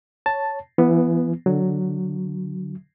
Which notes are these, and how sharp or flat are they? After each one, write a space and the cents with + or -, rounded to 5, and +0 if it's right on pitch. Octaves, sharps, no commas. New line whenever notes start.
C#5 +0 A5 +0
E3 +30 B3 +0
D3 +0 F#3 +0